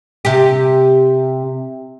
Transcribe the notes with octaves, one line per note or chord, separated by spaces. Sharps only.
C3 G4